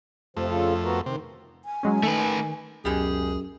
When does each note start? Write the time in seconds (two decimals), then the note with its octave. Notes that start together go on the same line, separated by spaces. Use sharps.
0.37 F2 C3 F3 A3
0.50 C#3 F4 A4
0.84 B3 F#4 A#4
1.06 C3 D#3
1.65 G#5
1.83 F#3 G#3 C#4
2.03 D#3 A3 B4
2.85 C#2 F#2 B2 G#3 G4 G#4